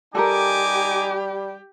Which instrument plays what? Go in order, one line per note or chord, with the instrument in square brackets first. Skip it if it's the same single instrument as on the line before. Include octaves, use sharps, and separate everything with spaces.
[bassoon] G3 [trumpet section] D#4 G#5 D6 [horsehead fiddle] G4 [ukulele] A4 A#4